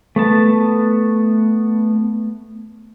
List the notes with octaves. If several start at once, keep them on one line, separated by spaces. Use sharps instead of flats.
A3 B3 A5